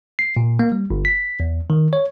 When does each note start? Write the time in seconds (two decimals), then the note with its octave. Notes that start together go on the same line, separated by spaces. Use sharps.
0.19 C7
0.37 A#2
0.59 A#3
0.72 G3
0.90 G1
1.05 B6
1.40 E2
1.70 D#3
1.93 C#5